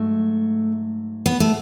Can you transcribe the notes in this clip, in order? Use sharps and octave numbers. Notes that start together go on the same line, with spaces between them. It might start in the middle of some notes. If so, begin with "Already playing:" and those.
Already playing: G#2 F#3 A3
B3
A3